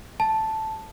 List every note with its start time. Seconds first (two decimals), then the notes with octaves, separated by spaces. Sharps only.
0.20 A5